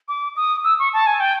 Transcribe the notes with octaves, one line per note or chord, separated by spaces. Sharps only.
D6
D#6
E6
C#6
A5
G#5
G5